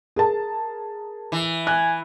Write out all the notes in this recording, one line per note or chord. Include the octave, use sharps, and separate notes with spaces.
G#4 A#4 A5
E3
G#5 F#6